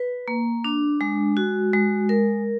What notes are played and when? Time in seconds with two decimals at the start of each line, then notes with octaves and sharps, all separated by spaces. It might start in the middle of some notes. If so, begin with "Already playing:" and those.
Already playing: B4
0.28 A#3
0.64 D4
1.01 G#3
1.37 F#4
1.73 G#3
2.09 A#4